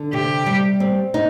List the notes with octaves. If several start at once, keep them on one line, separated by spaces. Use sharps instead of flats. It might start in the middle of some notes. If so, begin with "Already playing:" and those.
Already playing: D3
C3 G4
G3
C4
D#4